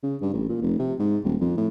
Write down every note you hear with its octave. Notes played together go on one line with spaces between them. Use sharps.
C#3
G2
A1
A#2
F1
C3
G#2
D#1
F2
A2